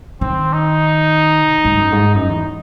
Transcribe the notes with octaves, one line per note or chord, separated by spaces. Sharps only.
D#3 C4
D#4
A2
G#2
F#2
G#2
F#2 D#4
E2